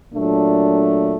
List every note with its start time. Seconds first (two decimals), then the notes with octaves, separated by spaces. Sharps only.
0.11 A#2 F#3 A3 D4 F4